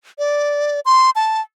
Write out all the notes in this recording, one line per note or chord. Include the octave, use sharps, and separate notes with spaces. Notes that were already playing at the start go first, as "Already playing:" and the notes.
D5
C6
A5